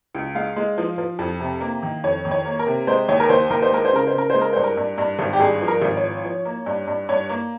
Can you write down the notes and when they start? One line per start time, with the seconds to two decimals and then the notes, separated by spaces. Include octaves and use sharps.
0.15 C#2
0.35 G#3 F5
0.56 G#3
0.78 F3
0.98 F3
1.19 F2
1.40 C3
1.61 A#3
1.83 D#3
2.04 F2 C#5
2.25 D#3
2.31 C#5
2.45 A#3
2.59 A#4
2.67 C3
2.87 G#3 C5
3.08 D#2 C#5
3.20 A#4
3.29 D#2 C5
3.50 D#2 A#4
3.62 C5
3.72 G#3 A#4
3.85 C5
3.93 C#3 A#4
4.07 C5
4.13 C#3 A#4
4.30 G#3 C5
4.41 A#4
4.53 G2 C5
4.64 A#4
4.77 G2
4.98 G2
5.19 G#1
5.33 G4
5.40 G2 G#4
5.62 F3
5.68 A#4
5.82 G#1
5.97 C#5
6.04 F3
6.24 F3
6.45 A#3
6.66 G2
6.87 G2
7.09 G2 C#5
7.29 A#3